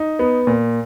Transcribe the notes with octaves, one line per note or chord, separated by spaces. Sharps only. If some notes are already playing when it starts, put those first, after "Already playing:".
Already playing: D#4
B3
A#2